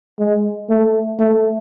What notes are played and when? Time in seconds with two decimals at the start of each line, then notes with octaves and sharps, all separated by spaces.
0.19 G#3
0.69 A3
1.19 A3